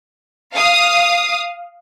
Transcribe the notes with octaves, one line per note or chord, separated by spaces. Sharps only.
F5 D#6